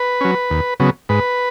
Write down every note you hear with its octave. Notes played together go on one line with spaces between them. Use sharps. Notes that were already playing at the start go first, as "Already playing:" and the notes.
Already playing: B4
F#3 C#4
D#2
C#3 F#3 B3
G#2 B4